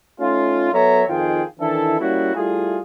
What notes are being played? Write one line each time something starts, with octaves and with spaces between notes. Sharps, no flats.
A3 C#4 D#4 F4
F#3 B3 A4 C#5 E5 A#5
F2 D#3 D#4 F4 G#4 G5
D#3 E3 D4 E4 A4
G3 A#3 C#4 E4 F#4
G3 A3 E4 F4 G#4